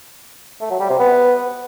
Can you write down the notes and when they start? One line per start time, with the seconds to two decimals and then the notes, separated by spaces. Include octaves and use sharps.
0.61 A3
0.70 F#3
0.80 G3
0.90 C3
0.99 B3